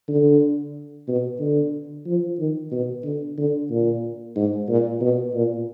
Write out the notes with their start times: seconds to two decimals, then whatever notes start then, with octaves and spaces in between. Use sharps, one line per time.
0.08 D3
1.08 B2
1.40 D3
2.06 F3
2.39 D#3
2.71 B2
3.04 D3
3.38 D3
3.71 A#2
4.36 G#2
4.69 A#2
5.01 B2
5.34 A#2